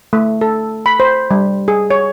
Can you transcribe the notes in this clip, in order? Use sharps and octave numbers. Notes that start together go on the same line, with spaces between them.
A3
A4
B5
C5
G3
G#4
C#5